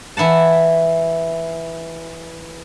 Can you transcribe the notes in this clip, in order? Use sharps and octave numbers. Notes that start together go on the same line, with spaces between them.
E3 E4 F#5 A5